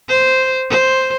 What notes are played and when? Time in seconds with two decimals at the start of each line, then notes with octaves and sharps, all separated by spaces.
0.09 C5
0.70 C5